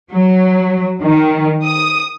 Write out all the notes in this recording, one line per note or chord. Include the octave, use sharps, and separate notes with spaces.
F#3
D#3
D#6